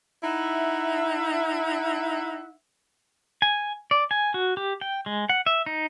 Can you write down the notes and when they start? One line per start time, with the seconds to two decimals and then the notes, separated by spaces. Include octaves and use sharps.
0.24 D#4 E4 E5 F#5
3.42 G#5
3.91 D5
4.11 G#5
4.34 F#4
4.57 G4
4.81 G5
5.06 G#3
5.29 F#5
5.46 E5
5.66 D#4